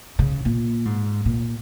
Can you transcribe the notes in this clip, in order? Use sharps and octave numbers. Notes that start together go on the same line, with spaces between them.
C#3
A#2
G#2
A#2